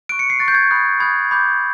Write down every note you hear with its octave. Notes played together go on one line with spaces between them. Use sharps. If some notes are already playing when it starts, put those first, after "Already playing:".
C#6 F#6 D7
C#7
C7
C#6 F#6 A6
G6
G#6
B5 D#6 F#6
B5 D#6 F#6 G#6
B5 D6 G6